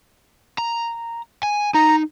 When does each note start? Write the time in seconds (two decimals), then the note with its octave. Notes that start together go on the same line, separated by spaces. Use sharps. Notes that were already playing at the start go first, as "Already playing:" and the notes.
0.58 A#5
1.43 G#5
1.74 D#4 A#5